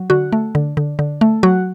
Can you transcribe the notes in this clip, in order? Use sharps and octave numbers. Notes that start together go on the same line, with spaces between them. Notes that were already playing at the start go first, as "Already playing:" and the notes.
Already playing: F#3
D3 F#4
A3
D3
D3
D3
A3
F#3 F#4